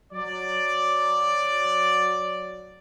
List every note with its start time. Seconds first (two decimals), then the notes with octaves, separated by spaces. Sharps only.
0.13 F#3 D5